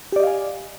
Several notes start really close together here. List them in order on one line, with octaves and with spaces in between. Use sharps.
G4 D5 D#5 F5 G#5